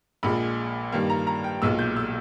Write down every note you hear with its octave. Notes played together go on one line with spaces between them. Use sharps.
A#1 A#2 G#3 B5
G2 D#3 A#3
A#5
A#5
G5
B1 A#2 G#3 E6
G6
E6